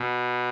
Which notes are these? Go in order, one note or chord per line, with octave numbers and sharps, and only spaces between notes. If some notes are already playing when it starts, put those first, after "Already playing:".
Already playing: B2